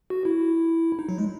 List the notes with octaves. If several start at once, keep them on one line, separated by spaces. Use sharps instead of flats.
F#4
E4
D#4
F#3
G#3